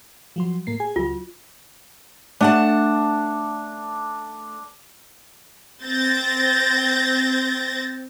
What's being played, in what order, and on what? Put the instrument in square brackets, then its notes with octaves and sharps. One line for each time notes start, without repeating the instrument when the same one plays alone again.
[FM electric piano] F3 F#3 C6
A2 A#3 C7
G#4 G#5
[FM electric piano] C#2 F#3 [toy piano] F4
[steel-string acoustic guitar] A3 F#5 A5 [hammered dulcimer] D4
[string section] C4 G6 A6 A#6